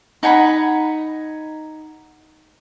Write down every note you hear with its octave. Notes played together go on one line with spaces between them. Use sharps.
D#4 F#5 G#5 B5